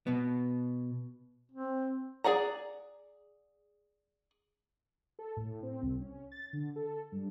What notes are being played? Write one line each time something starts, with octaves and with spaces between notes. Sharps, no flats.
B2 B3
C4
G#4 D5 F#5 A#5
A4
A2
C4
C2
C#4
A6
D3
A4
G2